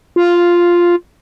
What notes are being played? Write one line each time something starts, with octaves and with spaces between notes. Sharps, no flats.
F4